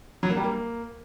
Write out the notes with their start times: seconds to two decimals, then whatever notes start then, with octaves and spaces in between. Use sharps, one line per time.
0.23 F#3
0.30 A#3
0.37 G3
0.44 A#3